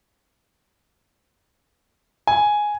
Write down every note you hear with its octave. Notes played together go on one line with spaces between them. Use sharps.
G#5